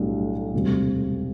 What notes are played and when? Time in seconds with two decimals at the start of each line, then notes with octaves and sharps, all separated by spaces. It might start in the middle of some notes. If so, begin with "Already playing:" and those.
Already playing: B1 A2 G3 D4
0.53 E1 D2 C3 G3